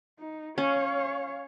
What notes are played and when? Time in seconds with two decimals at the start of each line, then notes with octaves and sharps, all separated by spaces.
0.19 D#4
0.58 C#4 C#5 F5